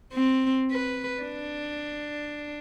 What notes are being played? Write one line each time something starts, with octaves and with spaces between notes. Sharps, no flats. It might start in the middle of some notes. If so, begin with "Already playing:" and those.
C4
B4
D4